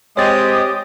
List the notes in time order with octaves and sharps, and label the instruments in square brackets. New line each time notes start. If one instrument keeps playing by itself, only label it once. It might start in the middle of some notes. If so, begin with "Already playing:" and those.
[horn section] G#3 C4 D#5 [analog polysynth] G4 [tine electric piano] C#5 A6 [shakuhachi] D#6